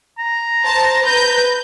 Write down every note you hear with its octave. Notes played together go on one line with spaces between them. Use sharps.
A#5
C5 A5
B4 G6